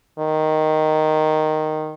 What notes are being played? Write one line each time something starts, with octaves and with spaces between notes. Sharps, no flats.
D#3